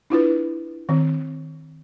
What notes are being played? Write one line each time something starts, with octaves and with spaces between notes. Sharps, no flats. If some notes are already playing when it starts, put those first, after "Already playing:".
D4 E4 F4 B4
D#3 C4